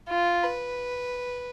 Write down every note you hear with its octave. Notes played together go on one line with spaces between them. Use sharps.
F4
B4